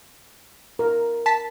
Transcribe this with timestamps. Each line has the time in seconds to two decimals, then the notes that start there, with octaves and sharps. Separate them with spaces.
0.79 A#4
1.26 A5 B6